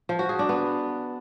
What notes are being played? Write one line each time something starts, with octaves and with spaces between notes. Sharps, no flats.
F3
F#4
G#4
D4
B3